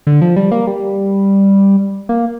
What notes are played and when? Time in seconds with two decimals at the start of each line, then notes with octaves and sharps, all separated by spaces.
0.07 D3
0.21 F3
0.36 G3
0.52 A#3
0.67 G3
2.09 A#3